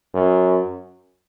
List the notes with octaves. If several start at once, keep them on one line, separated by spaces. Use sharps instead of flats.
F#2